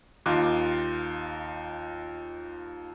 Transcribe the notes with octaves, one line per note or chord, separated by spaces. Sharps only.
D#2 D#4 F4 C6 D6 F#6